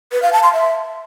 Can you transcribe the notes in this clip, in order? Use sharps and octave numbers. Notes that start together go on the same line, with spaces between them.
B4
F5
A5
C6
E5